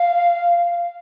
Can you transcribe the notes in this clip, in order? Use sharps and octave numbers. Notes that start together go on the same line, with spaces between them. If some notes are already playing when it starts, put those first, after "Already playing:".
Already playing: F5